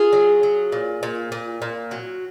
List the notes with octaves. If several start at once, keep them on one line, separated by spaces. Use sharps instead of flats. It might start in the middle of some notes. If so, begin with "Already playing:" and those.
Already playing: F4 G#4
F#3
F#3
A#2
A#2
A#2
A#2
F#3